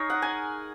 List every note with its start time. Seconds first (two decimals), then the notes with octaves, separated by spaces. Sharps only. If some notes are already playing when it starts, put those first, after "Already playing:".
Already playing: D#4 G#4 A#4 C#5
0.10 F#5
0.22 G#5